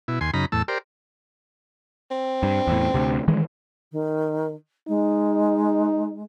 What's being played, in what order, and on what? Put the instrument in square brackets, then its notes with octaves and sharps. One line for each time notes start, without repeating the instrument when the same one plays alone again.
[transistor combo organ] B2 E4
D#2 G#5 C6
F#2 C#3 D#4 A#5 B5
E2 A2 A5 E6
G4 A#4 C5 D5
[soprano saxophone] C4
[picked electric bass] G2
E2 A2
D2 C3
D#3 E3 G#3
[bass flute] D#3
[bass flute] G#3 [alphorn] D#4